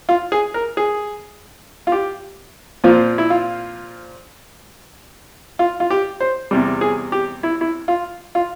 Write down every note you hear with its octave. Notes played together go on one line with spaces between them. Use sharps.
F4
G#4
A#4
G#4
F4
G4
A#2 F3 C4 F4
E4
F4
F4
F4
G4
C5
E2 C3 G3
G#4
G4
E4
E4
F4
F4